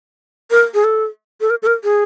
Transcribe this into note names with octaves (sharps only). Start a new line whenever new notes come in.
A#4
G#4
A4
A4
A#4
A4
A#4
G#4